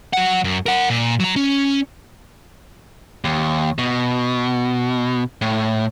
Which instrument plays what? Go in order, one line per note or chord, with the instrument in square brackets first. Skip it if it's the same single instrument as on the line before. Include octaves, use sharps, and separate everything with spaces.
[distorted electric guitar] F#3 F#5
F#2
A#4 F#5
A#2
F#3 A#5
C#4
[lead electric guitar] D#2
B2
A2